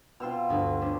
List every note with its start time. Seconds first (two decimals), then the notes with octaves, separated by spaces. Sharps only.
0.20 B2 C4 F4 C6 E6 F6
0.49 D2 G2
0.81 A3 C#4 D4